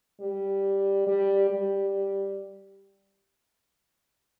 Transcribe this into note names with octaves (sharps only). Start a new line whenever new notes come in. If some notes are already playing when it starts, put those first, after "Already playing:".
G3
G3
G3